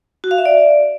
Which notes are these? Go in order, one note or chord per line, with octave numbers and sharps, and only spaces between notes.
F#4
F5
E5
D5